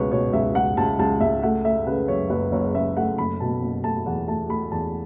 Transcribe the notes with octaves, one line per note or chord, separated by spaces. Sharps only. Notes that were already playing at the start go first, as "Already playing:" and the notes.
Already playing: C#2 B2 B4 C#5
B2 C#5
C#2 E5
C#2 F#5
C#2 A5
C#2 A5
C#2 E5
A3 F#5
A3 E5
C#3 B4
F#2 C#5
F#1 B4
F#1 C#5
C#3 E5
A3 F#5
F#1 B5
B2 A5
F#1
A3 A5
E2 F#5
A3 A5
A3 B5
E2 A5